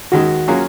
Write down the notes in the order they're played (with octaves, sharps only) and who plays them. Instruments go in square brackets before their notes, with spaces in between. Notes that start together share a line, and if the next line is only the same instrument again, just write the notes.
[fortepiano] D#2 D#3 G#3 [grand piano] F#4
[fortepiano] F#3 A#3 C#4 F4 G#4